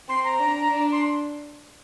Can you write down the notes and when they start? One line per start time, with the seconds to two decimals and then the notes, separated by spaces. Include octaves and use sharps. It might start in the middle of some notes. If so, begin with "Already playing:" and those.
0.09 C4 C6
0.24 A#5
0.40 D4
0.70 D4
0.92 C6